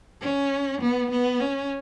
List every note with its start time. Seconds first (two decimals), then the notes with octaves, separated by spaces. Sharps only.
0.21 C#4
0.81 B3
1.11 B3
1.40 C#4